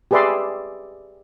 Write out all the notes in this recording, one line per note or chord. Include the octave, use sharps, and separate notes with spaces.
G4 G#4 B4 D5 E5 C6